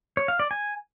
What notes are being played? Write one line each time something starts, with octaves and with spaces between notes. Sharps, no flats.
C#5
F5
D5
G#5